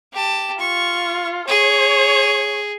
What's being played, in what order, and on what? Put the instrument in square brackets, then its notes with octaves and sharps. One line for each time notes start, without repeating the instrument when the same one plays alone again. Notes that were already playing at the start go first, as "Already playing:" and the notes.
[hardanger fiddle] G4 A5
[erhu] F4 [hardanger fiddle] C#6
[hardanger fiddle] G#4 [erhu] C#5